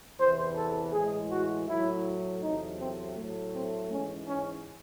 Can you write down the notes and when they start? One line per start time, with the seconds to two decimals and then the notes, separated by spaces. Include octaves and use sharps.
0.19 E2 C3 E3 C5
0.56 A4
0.93 A2 E3 G#3 G#4
1.31 F#4
1.68 A2 F#3 A3 E4
2.42 E2 C3 F#3 A3 D#4
2.80 C4
3.16 A2 F#3 A3
3.54 C4
3.91 G#2 E3 G#3 C#4
4.28 C#4